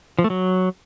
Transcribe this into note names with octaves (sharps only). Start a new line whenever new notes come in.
F3
A3
F#3